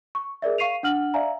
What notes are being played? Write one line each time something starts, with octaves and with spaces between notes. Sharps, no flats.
C#6
G#4 A#4 D5 E5
F5 C#6 C7 D#7 F7
D4 F#5 F6 F#7
D5 E5 F5 G#5 A#5